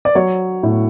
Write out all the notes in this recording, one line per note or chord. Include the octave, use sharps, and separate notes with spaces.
D5
F#3 C#5
A2